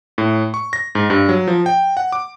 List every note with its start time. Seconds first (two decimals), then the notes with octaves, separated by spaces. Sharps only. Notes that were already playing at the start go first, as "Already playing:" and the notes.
0.18 A2
0.54 C#6
0.73 A#6
0.95 G#2
1.10 G2
1.29 F#3
1.47 F3
1.66 G5
1.97 F#5
2.12 D6